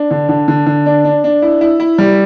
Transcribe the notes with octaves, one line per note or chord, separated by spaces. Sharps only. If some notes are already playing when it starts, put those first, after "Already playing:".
Already playing: D4
D3
D3
D3
D3
D4
D4
D4
E4
E4
E4
G3